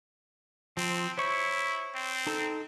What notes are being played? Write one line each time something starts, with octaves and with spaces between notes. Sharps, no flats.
F3 C4
E4 C5 C#5 C#6
C4
D#4 A4